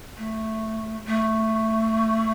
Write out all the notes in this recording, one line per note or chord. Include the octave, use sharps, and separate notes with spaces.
A3
A3